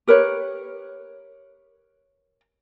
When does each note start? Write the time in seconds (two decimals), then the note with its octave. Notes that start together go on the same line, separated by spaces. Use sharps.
0.07 G4 A#4 B4 C#5